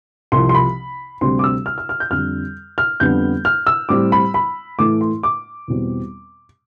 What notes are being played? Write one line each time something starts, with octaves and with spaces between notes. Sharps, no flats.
C2 C3 F3 C6
C6
B5
D2 C3 G3 C4 C6
D6
E6
F6
F6
F6
G6
F2 D3 G3 F6
F6
F2 D3 G3 B3 G6
F6
E6
A2 G3 C4 D6
B5
B5
A2 E3 A3 D6
C6
D6
E2 B2 G3 C4